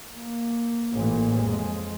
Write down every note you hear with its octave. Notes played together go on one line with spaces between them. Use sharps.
A#3
A1 A#2
F2 G#3